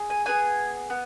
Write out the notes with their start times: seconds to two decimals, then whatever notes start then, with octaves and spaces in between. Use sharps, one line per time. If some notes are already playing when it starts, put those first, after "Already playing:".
Already playing: G#4
0.10 G#5
0.26 B3 F4 G#4 G#5
0.90 B3